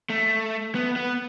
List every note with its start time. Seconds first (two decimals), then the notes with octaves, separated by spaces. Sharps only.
0.10 A3
0.75 B3
0.96 B3